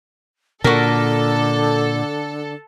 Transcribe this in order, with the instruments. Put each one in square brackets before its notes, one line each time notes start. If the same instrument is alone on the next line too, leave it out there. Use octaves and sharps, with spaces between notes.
[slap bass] A#2 [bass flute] D3 [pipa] F#4 A#4 [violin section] A4